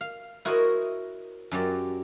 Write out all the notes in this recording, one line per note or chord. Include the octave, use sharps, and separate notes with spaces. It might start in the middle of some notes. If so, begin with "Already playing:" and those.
F5
E4 F#4 A#4 C5 C#5 D#5
F#2 F#3 G4 D5